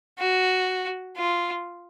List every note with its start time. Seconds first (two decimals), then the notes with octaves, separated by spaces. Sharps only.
0.19 F#4
1.16 F4